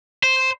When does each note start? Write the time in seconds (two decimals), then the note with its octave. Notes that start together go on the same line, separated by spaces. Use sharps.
0.23 C5